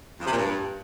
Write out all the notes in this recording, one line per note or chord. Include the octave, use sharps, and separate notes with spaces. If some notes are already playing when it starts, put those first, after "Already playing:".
F2
C3
A#2
G2